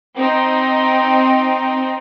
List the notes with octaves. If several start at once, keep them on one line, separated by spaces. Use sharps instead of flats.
C4 D#4